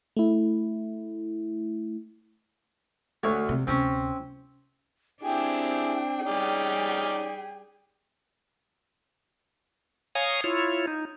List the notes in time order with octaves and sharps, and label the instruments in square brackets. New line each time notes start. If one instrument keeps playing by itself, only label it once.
[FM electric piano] A3 E4
[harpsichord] D2 C#5
[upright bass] C3
[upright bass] D2 C3 [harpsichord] C4 C#4
[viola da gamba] C4 D4 [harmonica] E4 G4 G#4 [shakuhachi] G5
[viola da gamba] G3 G#4 [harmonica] C#4 D#4 D5
[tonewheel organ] C#5 F5 G#5 A#5 D#6
E4 F4 C#5
D#4